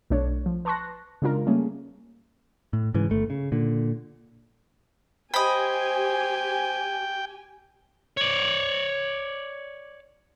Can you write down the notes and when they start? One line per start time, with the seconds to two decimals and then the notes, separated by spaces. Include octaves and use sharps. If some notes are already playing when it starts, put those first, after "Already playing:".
0.10 B1 A3 D4 C#5
0.46 F3
0.65 B4 A5 C6 C#6 F#6 A#6
1.22 C#3 G#3 D4 F4 A#4
1.47 G3 A3 A#3 C#4 G#4
2.73 A2
2.94 G#2 C#3 E3
3.10 G1 A3
3.30 C#3
3.52 A#2 D3
5.34 G4 C5 D#5 G5 G#5 B5
8.17 C#5 D5